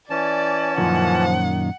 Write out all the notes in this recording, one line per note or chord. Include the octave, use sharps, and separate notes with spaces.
E3 C#4 D5 A5
F#2 A#2 D#3 F3 F#5